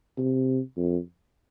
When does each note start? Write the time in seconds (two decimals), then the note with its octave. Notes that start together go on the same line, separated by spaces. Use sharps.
0.18 C3
0.77 F2